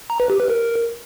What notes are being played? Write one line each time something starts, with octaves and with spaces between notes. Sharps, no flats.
A#5
B4
G4
B4
A#4